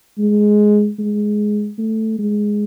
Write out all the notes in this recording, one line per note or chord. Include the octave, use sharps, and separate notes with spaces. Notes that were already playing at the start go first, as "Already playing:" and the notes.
G#3
G#3
A3
G#3